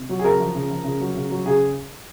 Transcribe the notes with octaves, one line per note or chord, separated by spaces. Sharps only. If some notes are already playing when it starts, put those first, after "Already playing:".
Already playing: C3
F#3
G#4
C#3 A#4
F3
C#3
F3
C#3
F#3
C#3
F#3
C#3 G#4